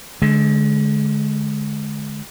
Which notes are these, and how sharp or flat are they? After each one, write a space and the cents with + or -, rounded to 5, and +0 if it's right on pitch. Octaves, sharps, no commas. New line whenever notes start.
D3 +0 G#3 +25